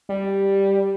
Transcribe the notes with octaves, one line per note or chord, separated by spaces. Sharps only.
G3